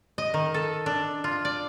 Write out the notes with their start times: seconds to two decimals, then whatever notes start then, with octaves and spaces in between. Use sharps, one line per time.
0.18 D#5
0.34 D#3
0.54 A4
0.86 D4
1.24 F4
1.45 D5